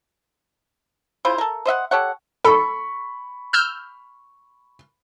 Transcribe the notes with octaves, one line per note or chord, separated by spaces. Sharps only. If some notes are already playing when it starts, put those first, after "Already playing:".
C#3 E4 F4 C5
A4 A#4
C5 D#5 E5 F#5
G4 A4 C#5 F#5
A4 B5 C#6
E6 F6 G6